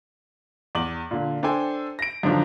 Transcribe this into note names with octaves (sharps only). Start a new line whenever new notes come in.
E2 D6 F#7
A#2 D3
D4 A4 C5 G5 G#5
A#6 D7
F#2 D3 D#3 F3 D4 D#4